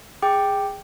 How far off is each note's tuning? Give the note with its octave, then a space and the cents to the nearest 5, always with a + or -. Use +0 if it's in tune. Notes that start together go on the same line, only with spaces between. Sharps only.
G#4 -20 G5 +0 D6 +10